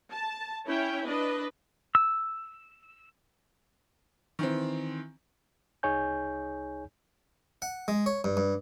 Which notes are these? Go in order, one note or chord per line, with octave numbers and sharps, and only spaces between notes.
A5
C#4 E4 C#5 G5
D4 B4 D#5
E6
D#3 E3 C4
C2 D#4 G#4 C#5 G#5 G6
F#5
G#3
C#5
G2
G2